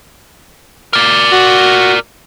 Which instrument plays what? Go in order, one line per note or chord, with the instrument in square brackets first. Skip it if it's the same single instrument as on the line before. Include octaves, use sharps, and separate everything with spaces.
[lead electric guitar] A#4 D5
[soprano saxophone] F#4